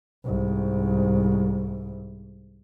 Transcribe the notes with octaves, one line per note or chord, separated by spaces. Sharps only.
C2 G#2